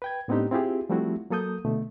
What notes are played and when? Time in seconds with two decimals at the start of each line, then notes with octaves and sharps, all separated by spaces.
0.02 B4 G5 G#6
0.28 A2 B3 C4 D4 D#4 G4
0.51 C4 E4 F4 G4 G#4
0.90 F3 G3 A3 C4 E4 F#4
1.30 F#3 A#3 A4 D#6 G6
1.65 B2 D3 A3